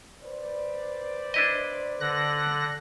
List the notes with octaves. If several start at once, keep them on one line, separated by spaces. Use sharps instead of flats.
B4 C5 D5
D4 E4 D#5
D3 F#6 A#6